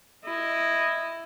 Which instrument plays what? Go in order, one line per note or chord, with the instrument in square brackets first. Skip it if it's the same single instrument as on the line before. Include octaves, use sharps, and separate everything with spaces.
[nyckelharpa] E4 [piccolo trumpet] D#5